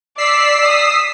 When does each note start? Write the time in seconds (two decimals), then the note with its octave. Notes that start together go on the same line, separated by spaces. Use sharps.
0.18 D5 E6 B6 C7
0.65 D#6